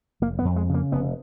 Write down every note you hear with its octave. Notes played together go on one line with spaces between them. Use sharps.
F1 A#3
B3
F2
G#3
C#3
A#3
F1 B3